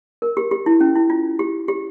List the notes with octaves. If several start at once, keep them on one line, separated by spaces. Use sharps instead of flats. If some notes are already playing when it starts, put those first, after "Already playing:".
A#4
G4
G4
E4
C#4
E4
F4
G4
G4